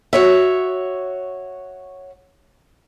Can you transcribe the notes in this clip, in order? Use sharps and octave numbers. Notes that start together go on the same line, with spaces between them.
F#4 C#5 E5